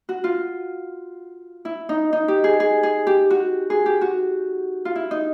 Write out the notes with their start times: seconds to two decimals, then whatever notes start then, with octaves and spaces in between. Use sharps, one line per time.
0.09 F#4
0.24 F4
1.65 E4
1.89 D#4
2.13 D#4
2.28 G4
2.44 G#4
2.60 G#4
2.83 G#4
3.07 G4
3.31 F#4
3.70 G#4
3.86 G4
4.01 F#4
4.85 F4
4.95 E4
5.11 D#4